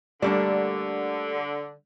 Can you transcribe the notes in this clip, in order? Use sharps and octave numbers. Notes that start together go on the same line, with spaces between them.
D3 G3 A3 A#3 D4 D5